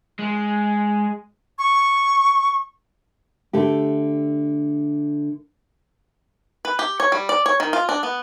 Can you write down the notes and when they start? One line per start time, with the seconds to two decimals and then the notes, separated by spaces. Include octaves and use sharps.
0.19 G#3
1.59 C#6
3.53 D3 A3 G4
6.65 B4
6.79 G4
7.00 C#5
7.12 G3
7.29 D5
7.46 C#5
7.60 D#3
7.73 F4
7.89 D4
8.03 B3